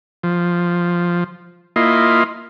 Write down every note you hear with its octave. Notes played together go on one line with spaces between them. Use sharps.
F3
A#3 E4 F4 D#5 C6